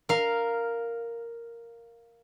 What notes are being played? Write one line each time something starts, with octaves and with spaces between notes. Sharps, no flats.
A#4 F5